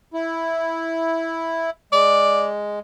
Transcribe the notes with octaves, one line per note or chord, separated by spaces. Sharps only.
E4
G#3 D5